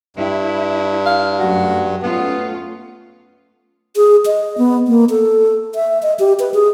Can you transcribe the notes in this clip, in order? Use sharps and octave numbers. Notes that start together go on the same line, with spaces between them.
G2 E4
F5
F#2 A3 F#4
A3 B3 C#4 F4
G#4
D#5
B3
A#3
A4
E5
D#5
G4
B4
G#4